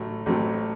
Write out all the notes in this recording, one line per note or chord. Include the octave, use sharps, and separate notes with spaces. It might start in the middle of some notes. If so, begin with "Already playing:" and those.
Already playing: A1 A2 F#3 A3
A1 A2 F#3 A3 C4